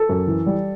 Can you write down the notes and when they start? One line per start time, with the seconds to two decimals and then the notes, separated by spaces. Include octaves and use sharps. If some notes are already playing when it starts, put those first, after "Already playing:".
Already playing: A4
0.09 F#2
0.27 E3
0.46 G3